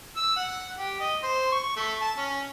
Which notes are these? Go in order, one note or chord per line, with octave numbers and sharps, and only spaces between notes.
E6
F#5
G4
D#5
C5
C#6
A3
A5
C#4